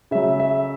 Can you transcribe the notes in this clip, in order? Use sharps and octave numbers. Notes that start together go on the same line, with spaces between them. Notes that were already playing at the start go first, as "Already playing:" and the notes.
C#3 F#3 E5
E5